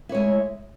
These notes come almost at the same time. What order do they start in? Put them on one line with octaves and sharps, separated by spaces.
E4 C#5 G#3